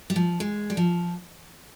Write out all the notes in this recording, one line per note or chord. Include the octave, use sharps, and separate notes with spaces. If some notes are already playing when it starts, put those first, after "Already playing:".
G3
F3
G#3
G3
F3